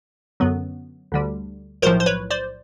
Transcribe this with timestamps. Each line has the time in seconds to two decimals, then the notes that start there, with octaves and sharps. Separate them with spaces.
0.40 F#2 D3 F#3 B3
1.12 D2 D3 G3
1.82 B1 A2 F3 A#4 C5
2.00 C5
2.06 B4 C#5
2.30 C5 D5